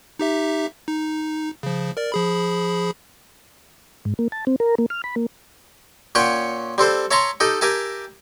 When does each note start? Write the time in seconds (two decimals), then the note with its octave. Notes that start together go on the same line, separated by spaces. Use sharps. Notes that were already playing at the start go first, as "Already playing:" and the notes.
0.19 D#4 G4 E5
0.88 D#4
1.63 C#3 F3
1.97 A#4 D5
2.12 F3 G#4 B5
4.05 G#2
4.19 A#3
4.32 A5
4.47 C4
4.60 A#4
4.78 A#3
4.90 F6
5.04 B5
5.16 A#3
6.15 A#2 C#4 C#5 F#5 G5 C#6
6.78 G3 C4 A4 C5
7.11 C#5 E5 A5 A#5 C6 C#6
7.40 D#4 G4 A4 D#5
7.61 G4 A#4 E5 G#5 A5